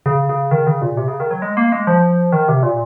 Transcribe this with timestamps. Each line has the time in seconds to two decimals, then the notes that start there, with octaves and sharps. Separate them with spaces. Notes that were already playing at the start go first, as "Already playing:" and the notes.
0.06 C#3
0.29 C#3
0.51 D#3
0.67 C#3
0.82 A#2
0.97 C3
1.08 C#3
1.20 D#3
1.31 F#3
1.42 G#3
1.57 A#3
1.72 G#3
1.87 F3
2.32 D#3
2.48 C3
2.63 A#2